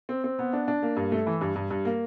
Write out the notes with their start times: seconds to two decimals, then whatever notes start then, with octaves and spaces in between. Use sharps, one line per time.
0.09 C4
0.24 C4
0.39 B3
0.53 D4
0.68 D4
0.83 A#3
0.96 G2
1.12 A3
1.26 E3
1.41 G2
1.56 G2
1.70 G2
1.85 A#3